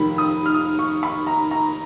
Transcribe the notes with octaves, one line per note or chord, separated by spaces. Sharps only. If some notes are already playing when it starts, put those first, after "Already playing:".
Already playing: F1 D#2 D#3 B5
D#6
F6
D#6
C#6
B5
A#5
A#5